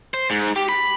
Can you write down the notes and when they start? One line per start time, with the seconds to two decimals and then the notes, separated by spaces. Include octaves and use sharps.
0.14 C5
0.30 G#2
0.56 G4
0.69 B5